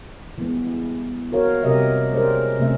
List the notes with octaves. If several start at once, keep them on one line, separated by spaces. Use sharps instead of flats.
E3 G3 G#3 B3
F#4 A#4 C#5 F5
C3 G3 G4 A#4 D#5 E5
G#3 C#4 G4 A#4 C5 D5
C3 A3 C#4 E5